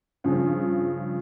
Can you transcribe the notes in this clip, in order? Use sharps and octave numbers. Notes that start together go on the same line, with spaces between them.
G2 C#3 F3